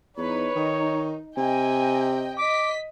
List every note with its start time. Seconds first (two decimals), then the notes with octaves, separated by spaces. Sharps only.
0.17 E2 D#4 B4 C#5
0.56 D#3 D#4
1.37 C3 D#5 G5 G#5
2.38 D#5 D6 B6